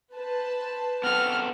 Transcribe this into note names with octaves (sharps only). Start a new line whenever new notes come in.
B4 C5 A5
B3 C4 A4 F6